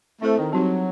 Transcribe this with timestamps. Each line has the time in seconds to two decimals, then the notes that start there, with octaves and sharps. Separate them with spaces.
0.22 A3 C4 E4 A4 C5
0.38 D#3
0.52 F#3 G3 C4 D#4 G4